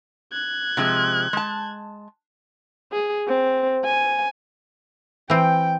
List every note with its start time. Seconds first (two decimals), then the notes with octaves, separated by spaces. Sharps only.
0.32 F#6 G#6
0.77 C3 F3 G#3
1.33 G#3 A5
2.92 G#4
3.28 C4
3.85 G#5
5.30 E3 C4 G5